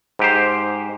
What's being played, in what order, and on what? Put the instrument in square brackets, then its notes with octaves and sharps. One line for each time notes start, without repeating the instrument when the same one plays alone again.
[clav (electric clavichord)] G#2 G4 C5